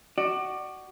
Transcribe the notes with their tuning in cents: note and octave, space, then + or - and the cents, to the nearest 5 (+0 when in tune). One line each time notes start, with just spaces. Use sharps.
F#4 +20 D5 +35